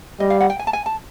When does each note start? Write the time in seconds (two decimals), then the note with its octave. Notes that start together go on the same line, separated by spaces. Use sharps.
0.20 G3 D#5
0.30 F5
0.40 F#5
0.50 G5
0.59 G#5
0.67 A5
0.73 G#5
0.86 A5